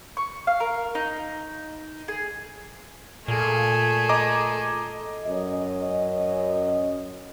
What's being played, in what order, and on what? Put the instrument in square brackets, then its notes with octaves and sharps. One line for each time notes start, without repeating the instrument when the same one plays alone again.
[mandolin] C#6
F5
A#4
D#4
G#4
[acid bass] A#2 [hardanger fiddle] A3 G#4
[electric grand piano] D#5 A#5 D6
[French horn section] F#2 C#4 D#5